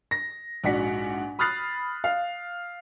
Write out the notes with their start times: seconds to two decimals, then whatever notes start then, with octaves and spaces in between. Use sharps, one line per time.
0.11 A#6
0.64 A#1 G#2 F#4 D5 F#5 B6
1.39 B5 D#6 F6 F#6 A6 C7
2.04 F5